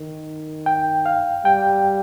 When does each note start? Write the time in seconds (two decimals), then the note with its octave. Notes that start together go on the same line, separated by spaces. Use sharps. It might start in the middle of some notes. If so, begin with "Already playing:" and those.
Already playing: D#3
0.66 G5
1.06 F5
1.45 G3 G5